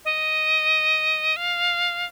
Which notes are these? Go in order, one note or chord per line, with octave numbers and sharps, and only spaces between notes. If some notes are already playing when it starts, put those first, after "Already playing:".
D#5
F5